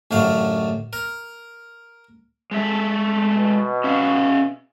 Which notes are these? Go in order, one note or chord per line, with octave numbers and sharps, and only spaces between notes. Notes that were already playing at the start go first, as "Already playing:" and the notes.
A1 F#2 D3 F#3 F5
A#4
G#3 A3 E5
B2
C#4 E5 F5